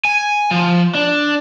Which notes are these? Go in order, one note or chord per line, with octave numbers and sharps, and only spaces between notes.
G#5
F3
D4